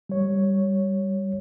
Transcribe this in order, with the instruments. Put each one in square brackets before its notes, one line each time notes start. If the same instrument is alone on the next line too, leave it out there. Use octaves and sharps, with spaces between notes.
[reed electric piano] G3 C#5